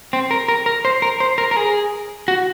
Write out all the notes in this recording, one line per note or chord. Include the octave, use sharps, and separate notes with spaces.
C4
A#4
A#4
A#4
C5
A#4
C5
A#4
A#4
G#4
F#4